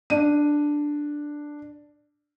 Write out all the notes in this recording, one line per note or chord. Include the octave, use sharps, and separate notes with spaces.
D4 D#7